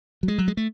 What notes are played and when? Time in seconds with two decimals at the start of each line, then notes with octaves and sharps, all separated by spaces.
0.23 F#3
0.28 G#3
0.38 F#3
0.48 G#3
0.57 A3